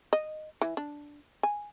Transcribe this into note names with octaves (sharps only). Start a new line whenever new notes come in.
D#5
E3
D4
G#5